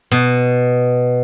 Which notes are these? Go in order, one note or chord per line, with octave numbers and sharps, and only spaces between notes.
B2